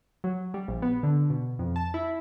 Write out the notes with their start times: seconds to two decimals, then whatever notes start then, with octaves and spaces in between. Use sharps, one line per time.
0.24 F#3
0.54 G3
0.68 A#1
0.82 B3
1.03 D3
1.30 B2
1.59 F2
1.76 A5
1.94 E4